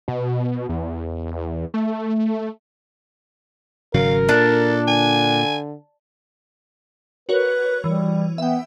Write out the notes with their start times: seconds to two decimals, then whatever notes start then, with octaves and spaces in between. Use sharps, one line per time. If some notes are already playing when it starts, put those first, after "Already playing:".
0.08 B2
0.69 E2
1.74 A3
3.94 G#1 C#3 F#3 A#4 F5
4.29 A#2 D4 A4
4.88 D3 G#5
7.29 F#4 A#4 B4 C#5
7.84 E3 G3
8.38 B3 E5 G5